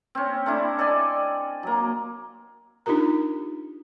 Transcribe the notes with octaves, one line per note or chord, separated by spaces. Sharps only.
C4 C#4
A3 C4 D4 E4
A4 D5 D#5 G#5
F#3 A#3
D4 D#4 F4 G4 A#4 A#5